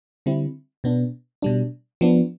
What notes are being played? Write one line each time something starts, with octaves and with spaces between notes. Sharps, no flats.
D3 G3 C4 E4
B2 B3 D4
B2 G3 D4
F3 B3 D4